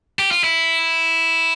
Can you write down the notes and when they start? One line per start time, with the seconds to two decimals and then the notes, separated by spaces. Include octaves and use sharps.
0.19 G4
0.31 F4
0.44 E4